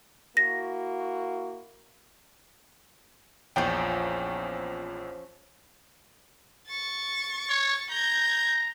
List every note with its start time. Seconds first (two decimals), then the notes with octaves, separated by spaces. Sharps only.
0.37 A#3 E4 F#4 A#6
3.56 A#1 E2 F3 C#4 G5
6.68 C#6 A6
7.49 C#5
7.90 A#5 G6 G#6